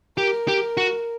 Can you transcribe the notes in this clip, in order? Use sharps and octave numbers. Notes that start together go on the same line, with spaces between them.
G4 A#4
G4
F#4